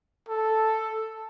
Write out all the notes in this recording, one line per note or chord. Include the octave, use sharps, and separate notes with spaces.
A4